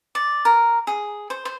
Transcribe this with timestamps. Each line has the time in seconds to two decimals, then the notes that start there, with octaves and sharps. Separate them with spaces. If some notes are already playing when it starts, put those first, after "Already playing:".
0.15 D5
0.45 A#4
0.87 G#4
1.30 C5
1.45 C5